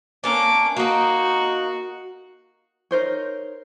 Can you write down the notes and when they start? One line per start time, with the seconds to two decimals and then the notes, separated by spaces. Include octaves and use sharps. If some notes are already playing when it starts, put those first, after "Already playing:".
0.24 A#3 C#4 D4 D6
0.77 A#3 D#4 F#4
2.91 D#4 A#4 C5 C#5